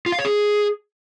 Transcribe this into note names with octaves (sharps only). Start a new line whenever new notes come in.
F4
F5
C#5
G#4